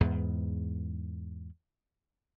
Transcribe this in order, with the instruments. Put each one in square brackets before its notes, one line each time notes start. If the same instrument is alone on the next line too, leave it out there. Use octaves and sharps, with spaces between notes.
[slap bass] E2 G#2 B3